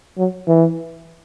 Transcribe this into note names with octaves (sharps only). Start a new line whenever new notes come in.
F#3
E3